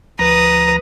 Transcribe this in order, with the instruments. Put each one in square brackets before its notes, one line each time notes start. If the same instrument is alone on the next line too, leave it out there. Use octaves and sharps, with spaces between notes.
[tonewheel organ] D2 F3 F#6 [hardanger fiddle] B4 D#6 [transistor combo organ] A#5